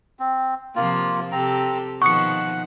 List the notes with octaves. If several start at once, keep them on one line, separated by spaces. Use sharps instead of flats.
C4
C3 F3 A#3 F4
C3 C4 G4 A4 A#5
B2 D#3 F3 F#5 C#6 D#6 C#7